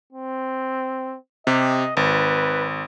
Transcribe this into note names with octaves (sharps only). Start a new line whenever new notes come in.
C4
C3 G4 D#5
G#1 B4